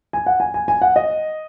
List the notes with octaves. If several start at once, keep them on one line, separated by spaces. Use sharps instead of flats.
G#5
F#5
G#5
G#5
G#5
F#5
D#5